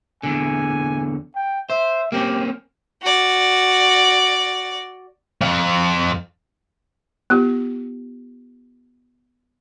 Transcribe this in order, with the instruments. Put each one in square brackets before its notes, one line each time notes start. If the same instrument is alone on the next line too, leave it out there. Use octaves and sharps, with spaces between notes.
[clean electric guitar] E2 D3 [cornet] G#5
[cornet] G5
[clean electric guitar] C5 [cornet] E5
[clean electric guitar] A#3 C4 C#4 [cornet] G4
[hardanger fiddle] F#4 D5
[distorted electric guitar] F2 F4
[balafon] B3 F4 G4